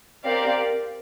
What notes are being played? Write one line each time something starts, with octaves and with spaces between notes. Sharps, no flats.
C4 G4 A#4 D5 F5